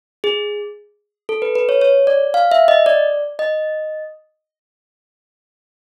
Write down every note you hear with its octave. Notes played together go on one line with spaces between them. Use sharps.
G#4
A4
B4
B4
C#5
C#5
D5
F5
E5
D#5
D5
D#5